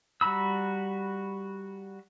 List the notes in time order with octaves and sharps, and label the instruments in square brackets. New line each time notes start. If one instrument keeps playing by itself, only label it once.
[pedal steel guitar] G3 F#4 A#5 B5 E6